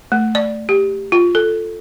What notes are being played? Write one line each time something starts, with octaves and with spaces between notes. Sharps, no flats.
A3
D5
G4
F4
A4